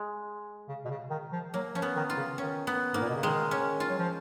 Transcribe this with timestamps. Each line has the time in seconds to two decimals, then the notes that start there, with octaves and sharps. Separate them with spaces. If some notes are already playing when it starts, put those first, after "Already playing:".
Already playing: G#3
0.68 C#3
0.85 B2
0.90 C#3
1.10 D#3
1.32 F3
1.54 F#3 A#3
1.75 F3 C#4
1.82 B3
1.96 D#3
2.10 F4
2.17 C#3
2.38 D#3 C#4
2.67 B3
2.94 G#2 A#3
3.01 A#2
3.09 B2
3.15 C#3
3.23 D#3 G#3
3.51 C#4
3.80 F4
3.89 F#3
3.98 F3